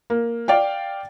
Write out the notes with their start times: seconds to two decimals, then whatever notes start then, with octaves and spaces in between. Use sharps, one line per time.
0.10 A#3
0.48 D5 F5 G5